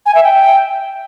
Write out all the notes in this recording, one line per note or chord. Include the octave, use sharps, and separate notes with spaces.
G#5
E5
G5